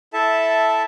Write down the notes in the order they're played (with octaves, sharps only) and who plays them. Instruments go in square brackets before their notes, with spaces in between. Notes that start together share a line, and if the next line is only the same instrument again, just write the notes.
[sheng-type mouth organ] E4 A4 E5 A5